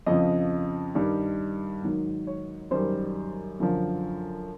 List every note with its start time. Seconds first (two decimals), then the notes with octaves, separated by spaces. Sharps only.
0.06 F2 C#3 F3 D#5
0.95 G2 D#3 G3
1.83 G#2 D#3 F#3
2.27 C#5
2.71 F#2 D#3 G3 C5
3.60 F#2 D3 F3